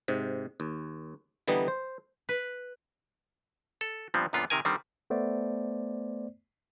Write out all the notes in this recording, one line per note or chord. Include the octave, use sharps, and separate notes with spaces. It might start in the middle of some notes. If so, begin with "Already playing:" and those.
G#2 C3
D#2
D3 E3 G3 B3 D#4
C5
B4
A4
G2 A#2 F3 G3 B3 C4
F#2 A#2 D3 B3 F4
C3 D#3 A#4 G#5
D3 D#3 G3 C4
A3 B3 C5 D5